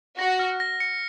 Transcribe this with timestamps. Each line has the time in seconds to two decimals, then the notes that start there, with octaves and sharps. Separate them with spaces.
0.18 F#4 A#6
0.39 F6
0.60 A#6
0.80 C#7